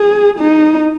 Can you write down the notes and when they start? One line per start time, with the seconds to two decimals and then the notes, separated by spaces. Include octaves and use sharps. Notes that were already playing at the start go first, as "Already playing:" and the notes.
Already playing: G#4
0.39 D#4